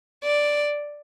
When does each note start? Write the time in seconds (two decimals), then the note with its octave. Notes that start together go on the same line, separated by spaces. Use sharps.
0.23 D5